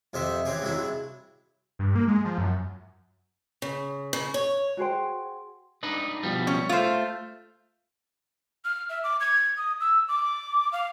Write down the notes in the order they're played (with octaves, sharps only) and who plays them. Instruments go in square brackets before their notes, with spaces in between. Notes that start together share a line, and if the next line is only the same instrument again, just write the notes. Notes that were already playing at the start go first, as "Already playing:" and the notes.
[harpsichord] F2 C3 C5 D#5 E5
E3 C4 C#4 G4 G#4
G2 C3 F#3 G#3 E4
[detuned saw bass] G2
A#3
G#3
F3
F#2
[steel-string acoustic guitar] C#3
C#3
C#5
[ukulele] F#4 G#4 C5 G5
[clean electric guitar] D4 D#4 B4
B2 F3 G3
[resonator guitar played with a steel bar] C#4
[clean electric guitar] A3 [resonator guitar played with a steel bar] F4 C5
[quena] F6
E5
D6
G#6
D#6
E6
D6
F5